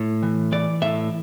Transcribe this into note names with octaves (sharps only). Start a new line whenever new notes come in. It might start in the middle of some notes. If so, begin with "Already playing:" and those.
Already playing: A2
E3
E3 D5
A2 E5